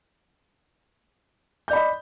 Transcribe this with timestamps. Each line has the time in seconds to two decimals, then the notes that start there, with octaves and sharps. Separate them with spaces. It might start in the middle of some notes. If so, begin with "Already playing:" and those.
1.68 G6
1.71 D5
1.73 B5
1.76 D#5